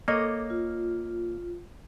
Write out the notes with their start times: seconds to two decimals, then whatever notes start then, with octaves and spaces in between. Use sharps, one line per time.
0.08 A#3 A4 C#5 D#5 D6
0.50 F4